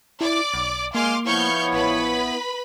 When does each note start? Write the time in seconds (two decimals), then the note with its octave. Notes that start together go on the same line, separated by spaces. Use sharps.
0.21 E4 D5 D6
0.54 B1
0.95 G#3 A#3 F5 G#5 C6 D6 F6
1.26 F3 B3 E4 C#5 C#6 F6 G6
1.73 A1 B4 B5